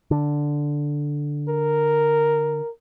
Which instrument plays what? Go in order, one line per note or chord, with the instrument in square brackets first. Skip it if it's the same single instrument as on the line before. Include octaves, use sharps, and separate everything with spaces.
[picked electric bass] D3
[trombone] A#4